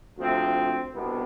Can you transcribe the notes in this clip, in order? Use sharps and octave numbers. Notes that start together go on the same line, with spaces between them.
D2 C3 F3 C4
C2 B2 B3 D4